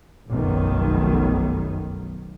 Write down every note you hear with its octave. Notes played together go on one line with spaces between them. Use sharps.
F1 B1 F#2 D#3